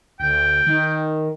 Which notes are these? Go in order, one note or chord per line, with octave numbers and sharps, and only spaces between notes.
D2 G5
D#3